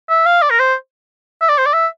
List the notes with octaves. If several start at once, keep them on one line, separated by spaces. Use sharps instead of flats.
E5
F5
D5
A#4
C5
E5
D5
C5
D5
E5